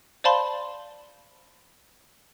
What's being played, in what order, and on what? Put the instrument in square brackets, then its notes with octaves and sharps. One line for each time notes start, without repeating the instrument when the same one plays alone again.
[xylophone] C5 D5 F5 A5 B5 C6